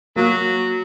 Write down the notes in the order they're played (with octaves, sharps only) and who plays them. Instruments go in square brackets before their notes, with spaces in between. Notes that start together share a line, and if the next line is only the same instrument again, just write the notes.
[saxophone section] F#3 [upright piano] A#3